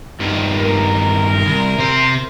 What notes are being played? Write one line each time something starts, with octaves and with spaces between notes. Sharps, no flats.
G2 D#3
A#4
C2
C3 C5